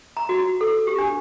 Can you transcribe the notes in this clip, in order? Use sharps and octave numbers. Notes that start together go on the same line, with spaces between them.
A#5
F#4
A4
G4
D4